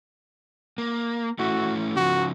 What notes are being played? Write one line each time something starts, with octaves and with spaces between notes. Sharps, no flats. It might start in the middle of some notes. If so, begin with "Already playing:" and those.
A#3
A3 C#4 E4 F#4
C#3 F3 F#4